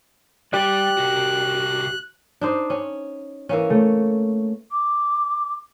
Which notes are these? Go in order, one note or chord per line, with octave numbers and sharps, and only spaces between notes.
G3 G4 D5 F#6
C2 F#4
D4 D#4 C5
C#4
E3 A#3 C#4
A3 C#5
D6